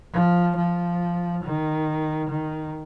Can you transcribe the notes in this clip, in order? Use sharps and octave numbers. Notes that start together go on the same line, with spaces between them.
F3
F3
D#3
D#3